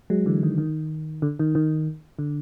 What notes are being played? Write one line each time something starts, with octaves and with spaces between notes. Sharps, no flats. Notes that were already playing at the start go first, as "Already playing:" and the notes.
F#3 G#3
D3 E3
D#3
D#3
D3
D#3
D#3
D3